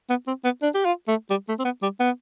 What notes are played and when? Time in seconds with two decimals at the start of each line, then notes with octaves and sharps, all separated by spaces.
0.10 B3
0.27 C4
0.44 B3
0.62 D4
0.74 G4
0.85 F4
1.08 A3
1.30 G3
1.48 A3
1.59 C4
1.65 B3
1.82 G3
2.00 B3